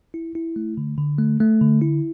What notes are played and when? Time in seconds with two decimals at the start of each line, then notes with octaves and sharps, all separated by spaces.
0.14 E4
0.35 E4
0.56 A3
0.77 D3
0.98 D3
1.18 A3
1.40 A3
1.61 D3
1.82 E4